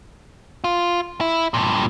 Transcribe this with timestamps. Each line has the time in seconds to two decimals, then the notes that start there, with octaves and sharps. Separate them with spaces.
0.64 F4
1.21 E4
1.54 G2 A#2